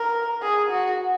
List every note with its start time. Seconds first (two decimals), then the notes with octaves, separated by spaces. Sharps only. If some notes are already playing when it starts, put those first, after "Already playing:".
Already playing: A#4
0.42 G#4
0.71 F#4